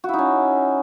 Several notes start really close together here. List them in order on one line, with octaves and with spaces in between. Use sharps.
F#4 E4 D#4 C#4